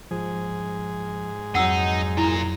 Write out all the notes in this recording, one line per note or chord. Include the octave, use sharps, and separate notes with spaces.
G#2 F3 G#4
F2 F#3 D#4 F#5 E6
A#2 E4 A#5